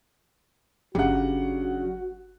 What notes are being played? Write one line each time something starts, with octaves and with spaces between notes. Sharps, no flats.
G1 C#3 F#3 C#4 D4 F#4 G4 F#5